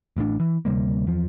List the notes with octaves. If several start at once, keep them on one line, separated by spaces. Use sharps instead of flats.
A1 A2 C3 D4
E3
D2 C3 G3 A#3
E2 F3